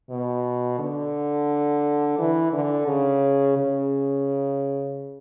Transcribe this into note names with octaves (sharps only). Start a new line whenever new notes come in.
B2
D3
E3
D3
C#3
C#3